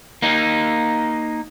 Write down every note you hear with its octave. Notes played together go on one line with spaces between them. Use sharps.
A#3 D#4